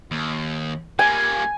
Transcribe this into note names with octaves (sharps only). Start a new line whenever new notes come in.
D#2
G3 A#3 G#5